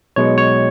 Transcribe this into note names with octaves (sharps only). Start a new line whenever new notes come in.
B1 B2 G#3 C#5
C#5